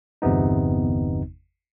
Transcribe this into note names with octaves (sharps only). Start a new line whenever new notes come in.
G1 E2 C3 B3 D#4